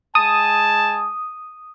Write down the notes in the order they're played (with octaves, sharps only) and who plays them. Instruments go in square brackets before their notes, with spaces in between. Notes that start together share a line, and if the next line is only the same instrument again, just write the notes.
[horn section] G#3 G#5 A5 [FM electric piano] D#6